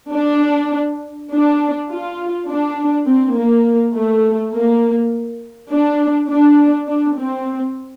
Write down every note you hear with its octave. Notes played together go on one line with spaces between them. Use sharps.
D4
D4
F4
D4
C4
A#3
A3
A#3
D4
D4
D4
C4